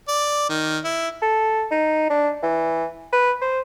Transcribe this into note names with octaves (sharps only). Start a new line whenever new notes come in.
D5
D#3
E4
A4
D#4
D4
E3
B4
C5